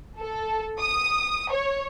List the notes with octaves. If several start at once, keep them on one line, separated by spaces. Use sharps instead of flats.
A4
D#6
C#5